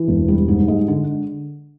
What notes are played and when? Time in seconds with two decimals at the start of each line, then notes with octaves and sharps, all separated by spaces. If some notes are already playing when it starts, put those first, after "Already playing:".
Already playing: E3
0.08 E1
0.28 G3
0.48 G#2
0.68 G#3
0.88 D3